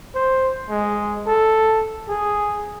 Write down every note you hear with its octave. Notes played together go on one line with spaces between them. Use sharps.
C5
G#3
A4
G#4